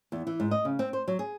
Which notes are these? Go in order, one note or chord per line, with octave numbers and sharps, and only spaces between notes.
E2
E3
G#2
D#5
C#3
C4
C5
F#3
G#4